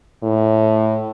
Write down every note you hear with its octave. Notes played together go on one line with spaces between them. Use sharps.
A2